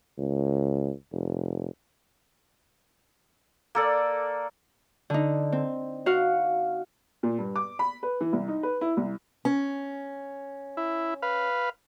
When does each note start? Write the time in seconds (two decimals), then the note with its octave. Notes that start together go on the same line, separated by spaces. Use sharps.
0.18 C#2
1.12 F1
3.75 A#3 A4 D5
5.10 D3 D#4
5.52 C4
6.06 F#4 F5 F#5
7.23 A#2
7.39 G2
7.56 D6
7.79 B5
8.03 B4
8.21 E3
8.33 C2
8.48 D#4
8.63 B4
8.81 E4
8.97 C2
9.45 C#4
10.77 E4
11.22 B4 F5